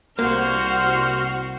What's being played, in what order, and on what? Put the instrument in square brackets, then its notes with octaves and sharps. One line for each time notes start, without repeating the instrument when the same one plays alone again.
[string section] C2 F#4 [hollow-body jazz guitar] A#3 [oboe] C5 [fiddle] F6